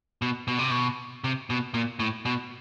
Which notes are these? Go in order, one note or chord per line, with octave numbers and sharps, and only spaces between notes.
B2
B2
C3
B2
C3
B2
A#2
A2
B2